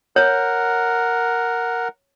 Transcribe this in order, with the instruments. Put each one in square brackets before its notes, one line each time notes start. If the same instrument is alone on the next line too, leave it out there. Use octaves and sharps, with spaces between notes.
[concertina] A#4 F#5 [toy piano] C#5